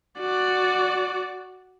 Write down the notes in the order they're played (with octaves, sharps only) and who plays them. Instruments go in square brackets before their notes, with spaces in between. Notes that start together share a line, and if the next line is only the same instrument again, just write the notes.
[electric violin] F#4 D5